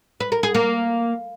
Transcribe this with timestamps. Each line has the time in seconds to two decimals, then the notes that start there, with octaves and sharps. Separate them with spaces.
0.20 B4
0.32 A#4
0.43 G#4
0.55 A#3